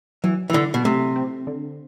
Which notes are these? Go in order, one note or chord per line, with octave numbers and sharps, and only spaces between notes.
E3 F#3
E3
D3 E4
B2
C3 A3
C4
D3